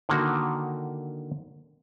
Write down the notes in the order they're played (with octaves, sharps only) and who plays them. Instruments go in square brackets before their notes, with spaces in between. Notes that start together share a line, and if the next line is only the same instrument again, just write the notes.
[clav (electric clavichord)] D3 D#3 A#3 F#4